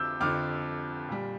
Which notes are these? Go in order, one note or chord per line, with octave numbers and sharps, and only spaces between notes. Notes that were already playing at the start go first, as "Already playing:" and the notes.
Already playing: F2 D3 F3 D6 E6 G6
F2 D3 F3 D6 F6
A#2 G3